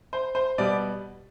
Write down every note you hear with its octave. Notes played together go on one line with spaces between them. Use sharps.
C5
C5
B2 G3 B3 D5